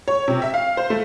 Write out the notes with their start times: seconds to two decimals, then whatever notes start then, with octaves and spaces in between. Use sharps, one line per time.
0.08 C#5
0.28 C3
0.42 E5
0.54 F5
0.77 C5
0.90 A3